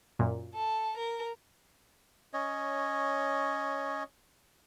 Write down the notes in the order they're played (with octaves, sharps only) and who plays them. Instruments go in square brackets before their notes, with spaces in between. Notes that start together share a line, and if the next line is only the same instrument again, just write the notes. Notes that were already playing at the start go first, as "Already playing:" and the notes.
[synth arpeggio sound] F#2 A#2
[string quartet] A4
A#4
[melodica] C#4 C#5 D#5